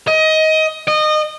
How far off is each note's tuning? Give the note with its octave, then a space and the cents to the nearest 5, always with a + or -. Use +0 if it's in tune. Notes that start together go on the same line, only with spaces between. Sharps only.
D#5 +20
D#5 -25